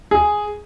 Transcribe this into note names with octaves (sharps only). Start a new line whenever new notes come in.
G#4